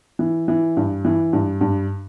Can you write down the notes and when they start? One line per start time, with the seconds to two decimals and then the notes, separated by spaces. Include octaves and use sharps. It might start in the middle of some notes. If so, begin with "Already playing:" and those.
0.19 E3
0.48 E3
0.77 G2
1.05 E3
1.33 G2
1.61 G2